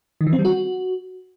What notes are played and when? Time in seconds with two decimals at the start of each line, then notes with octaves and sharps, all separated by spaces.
0.21 D#3
0.27 E3
0.33 C4
0.39 G3
0.45 F#4